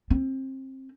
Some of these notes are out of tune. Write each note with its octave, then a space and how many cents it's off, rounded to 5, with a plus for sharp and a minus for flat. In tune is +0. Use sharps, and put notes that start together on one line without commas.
C4 +25